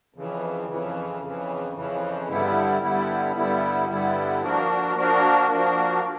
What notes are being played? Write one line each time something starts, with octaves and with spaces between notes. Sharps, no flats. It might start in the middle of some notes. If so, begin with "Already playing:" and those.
F2 C#3 E3
F2 C#3 E3
F2 C#3 E3
F2 C#3 E3
G2 D3 G3 B3 E4
G2 D3 G3 B3 E4
G2 D3 G3 B3 E4
G2 D3 G3 B3 E4
F3 A#3 D4 F#4 A#4
F3 A#3 D4 F#4 A#4
F3 A#3 D4 F#4 A#4